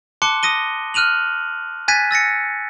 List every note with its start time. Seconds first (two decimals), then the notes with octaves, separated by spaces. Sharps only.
0.22 A5 C6 D6 F#6 C#7
0.43 D#6 A#6 D#7 G7
0.94 F6 F#6 D#7 F7 F#7
1.88 G#5 F#6 G#6 A6 B6 D#7
2.11 E6 A6 A#6 C#7